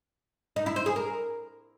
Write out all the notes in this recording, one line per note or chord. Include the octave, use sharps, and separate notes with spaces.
D#4
E4
C5
G#4
A#4